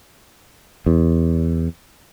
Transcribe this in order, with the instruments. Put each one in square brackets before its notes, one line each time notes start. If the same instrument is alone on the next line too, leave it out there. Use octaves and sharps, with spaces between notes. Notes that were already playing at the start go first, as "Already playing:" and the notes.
[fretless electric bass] E2